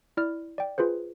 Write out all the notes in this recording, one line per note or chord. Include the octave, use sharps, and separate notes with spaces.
E4 D5 F6
D5 G5
F4 G#4 B4 C5